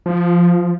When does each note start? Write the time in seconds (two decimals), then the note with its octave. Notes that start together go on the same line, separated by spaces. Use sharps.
0.06 F3